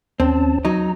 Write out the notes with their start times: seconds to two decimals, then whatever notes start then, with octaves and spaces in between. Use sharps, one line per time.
0.20 D#2 C4 C#4 A5
0.65 F#3 D#4 A#5